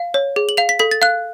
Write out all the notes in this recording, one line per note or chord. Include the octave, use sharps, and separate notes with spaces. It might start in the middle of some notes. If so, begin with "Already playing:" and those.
Already playing: F5
C#5
G#4
F#7
F5 F7
B6
A4 B6
A6
F5 F#6